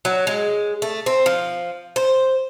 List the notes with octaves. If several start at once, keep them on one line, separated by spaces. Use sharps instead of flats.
F#3
G#3
A3
C4
F3
C5